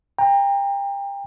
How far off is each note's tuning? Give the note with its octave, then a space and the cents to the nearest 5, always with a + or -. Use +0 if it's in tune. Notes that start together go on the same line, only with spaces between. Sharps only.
G5 +30 A#5 +0